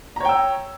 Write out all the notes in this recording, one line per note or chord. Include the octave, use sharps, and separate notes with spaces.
C#5 G5 A#5 E6